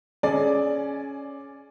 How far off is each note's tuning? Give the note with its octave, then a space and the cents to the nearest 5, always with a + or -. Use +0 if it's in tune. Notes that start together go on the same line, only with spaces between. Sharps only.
C#4 +0 G#4 +25 D5 +0